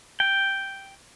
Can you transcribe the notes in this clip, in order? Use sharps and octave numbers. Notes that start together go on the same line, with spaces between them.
G5